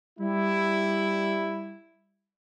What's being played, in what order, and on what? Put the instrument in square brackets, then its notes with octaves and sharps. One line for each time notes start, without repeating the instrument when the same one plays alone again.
[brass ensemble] G3 E4